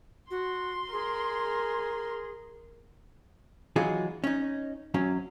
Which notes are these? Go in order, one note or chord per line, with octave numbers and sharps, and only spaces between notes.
F#4 C6
G#4 A#4
E3 F#3 G#3 D#4 F4 G#4
C#4 D#4
F#2 F#3 C#4